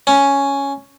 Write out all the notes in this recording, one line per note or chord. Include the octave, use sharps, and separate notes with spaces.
C#4